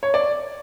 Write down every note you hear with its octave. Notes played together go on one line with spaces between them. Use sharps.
C#5
D5